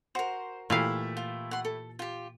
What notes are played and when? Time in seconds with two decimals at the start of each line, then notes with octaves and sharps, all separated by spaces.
0.15 F#4 A#4 C5
0.70 A#2 E3 A3 E4 G4 F5
1.17 F4
1.51 F#5 C6
1.65 A4
1.99 F4 G4